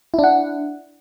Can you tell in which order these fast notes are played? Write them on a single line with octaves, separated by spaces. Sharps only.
E4 D4 F#5